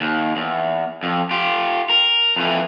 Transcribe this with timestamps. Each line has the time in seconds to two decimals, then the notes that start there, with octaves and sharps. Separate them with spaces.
0.01 D#2
0.36 E2
1.03 F2
1.31 F4 G4
1.90 A#4
2.36 F2 E3